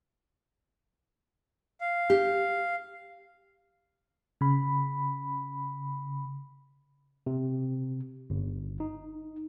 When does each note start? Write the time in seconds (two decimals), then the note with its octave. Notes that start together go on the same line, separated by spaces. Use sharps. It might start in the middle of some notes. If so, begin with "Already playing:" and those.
1.81 F5
2.10 G4
4.41 C#3 B5
7.26 C3
8.30 G1
8.80 D#4